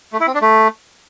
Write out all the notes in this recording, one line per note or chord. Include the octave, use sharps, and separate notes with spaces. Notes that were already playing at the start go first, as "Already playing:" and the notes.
A3
E4
C4
D4
A3